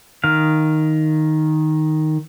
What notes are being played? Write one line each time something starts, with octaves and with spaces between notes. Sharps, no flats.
D#3 F5